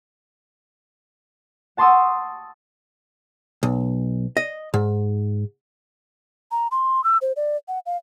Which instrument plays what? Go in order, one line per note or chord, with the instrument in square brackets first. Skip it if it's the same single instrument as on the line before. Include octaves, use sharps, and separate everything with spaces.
[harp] F#5 A5 C6 C#6 D#6 E6
[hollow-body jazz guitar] B1
D#5
G#2
[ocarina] A#5
C6
E6
C5
D5
F#5
F5